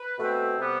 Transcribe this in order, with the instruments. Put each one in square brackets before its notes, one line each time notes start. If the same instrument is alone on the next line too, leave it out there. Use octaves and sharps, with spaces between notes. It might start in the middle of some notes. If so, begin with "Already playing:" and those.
Already playing: [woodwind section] B4
B2 A3 C4
C3 G3 B3